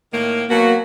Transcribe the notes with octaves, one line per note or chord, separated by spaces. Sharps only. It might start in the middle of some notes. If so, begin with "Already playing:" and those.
A2 D#3 A#3
B2 F#3 A#3 F#4